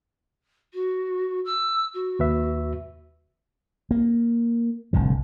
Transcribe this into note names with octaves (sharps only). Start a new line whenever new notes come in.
F#4
E6
F#4
D#2 B4 E5
A#3
F1 C2 A2 D3